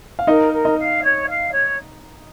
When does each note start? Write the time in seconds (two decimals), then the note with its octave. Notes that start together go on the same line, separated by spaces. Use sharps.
0.19 F5
0.27 D#4 A#4 D#5
0.52 A#4
0.65 D#4 D#5
0.77 F5
1.03 C#5
1.27 F5
1.51 C#5